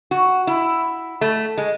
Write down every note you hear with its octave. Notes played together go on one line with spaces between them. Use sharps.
F#4
E4
A3
G#3